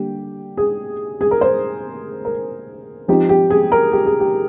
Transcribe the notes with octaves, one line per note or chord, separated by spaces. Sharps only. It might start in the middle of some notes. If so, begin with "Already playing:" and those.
Already playing: D3 G3 A#3 G4
G#4
G#4
A#4
C5
A#4
F3 C4 D#4 G4
G4
G#4
A#4
G4
G#4
G4